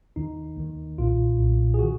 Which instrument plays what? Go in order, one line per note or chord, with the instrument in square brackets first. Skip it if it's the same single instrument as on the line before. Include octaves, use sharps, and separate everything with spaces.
[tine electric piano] D#2 D#3 D#4
D#2 D#3
B1 A#2 F4
B1 A#2
G#4
D#3 F#4